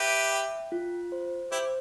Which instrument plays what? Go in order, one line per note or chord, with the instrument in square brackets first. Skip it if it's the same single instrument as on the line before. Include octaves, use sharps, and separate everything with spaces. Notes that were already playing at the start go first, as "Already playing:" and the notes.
Already playing: [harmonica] G4 B4 [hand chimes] E5
[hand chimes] G5
F4
C5
[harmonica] E4 G4 [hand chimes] C5